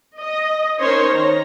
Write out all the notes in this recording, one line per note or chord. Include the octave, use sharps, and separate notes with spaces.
D#5
C#4 D#4 A#4 C5 C#5 C6
D#3 A#5